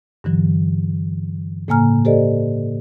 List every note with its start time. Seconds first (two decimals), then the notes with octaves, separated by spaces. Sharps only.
0.24 G2 D3 E3 F#3
1.68 A2 C#3 A#3 G#5 A#5 F6
2.05 G4 A4 C5 D5 D#5